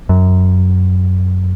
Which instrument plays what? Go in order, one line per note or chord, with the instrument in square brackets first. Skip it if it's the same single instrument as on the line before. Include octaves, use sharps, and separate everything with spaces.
[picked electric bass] F#2